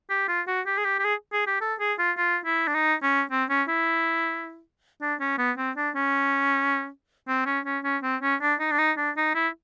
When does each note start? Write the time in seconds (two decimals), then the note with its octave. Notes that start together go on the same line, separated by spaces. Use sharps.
0.10 G4
0.28 F4
0.47 F#4
0.66 G4
0.78 G#4
0.85 G4
0.99 G4
1.04 G#4
1.33 G#4
1.47 G4
1.61 A4
1.80 G#4
1.99 F4
2.17 F4
2.45 E4
2.67 D4
2.74 D#4
3.03 C#4
3.31 C4
3.50 C#4
3.68 E4
5.01 D4
5.20 C#4
5.38 B3
5.58 C4
5.77 D4
5.95 C#4
7.28 C4
7.46 C#4
7.66 C#4
7.84 C#4
8.03 C4
8.22 C#4
8.41 D4
8.60 D#4
8.71 D4
8.79 D#4
8.97 D4
9.17 D#4
9.35 E4